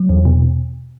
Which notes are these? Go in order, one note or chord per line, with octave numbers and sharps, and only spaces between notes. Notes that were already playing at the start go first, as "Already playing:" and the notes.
Already playing: F#3
E2
B2